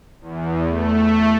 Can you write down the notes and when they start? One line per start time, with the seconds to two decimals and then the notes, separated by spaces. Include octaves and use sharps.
0.21 E2
0.69 A3